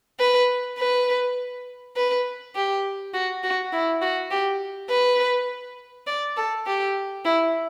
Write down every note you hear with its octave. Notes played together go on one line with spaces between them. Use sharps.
B4
B4
B4
G4
F#4
F#4
E4
F#4
G4
B4
D5
A4
G4
E4